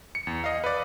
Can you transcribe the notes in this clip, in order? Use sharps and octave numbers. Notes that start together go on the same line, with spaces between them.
C#7
E2
D#5 F5
B4 D5